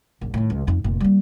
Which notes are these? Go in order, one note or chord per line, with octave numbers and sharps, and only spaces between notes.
A#1 F#2
A2 D#3
C#2
F2 D#4
F1 A#2
G3 A#3